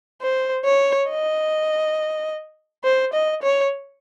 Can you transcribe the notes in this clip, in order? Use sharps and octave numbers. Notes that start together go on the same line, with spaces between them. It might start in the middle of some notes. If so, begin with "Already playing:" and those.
C5
C#5
D#5
C5
D#5
C#5